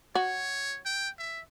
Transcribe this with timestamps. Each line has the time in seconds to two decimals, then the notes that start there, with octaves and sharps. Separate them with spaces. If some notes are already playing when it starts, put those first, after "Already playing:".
0.15 F#4 C#5
0.85 G5
1.18 E5